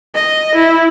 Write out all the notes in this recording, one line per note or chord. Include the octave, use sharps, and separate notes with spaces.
D#5
E4